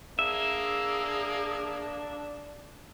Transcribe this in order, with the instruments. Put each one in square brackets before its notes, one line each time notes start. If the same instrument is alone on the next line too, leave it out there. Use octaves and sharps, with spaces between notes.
[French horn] A#3 [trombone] D4 [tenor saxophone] G#4 [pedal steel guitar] E5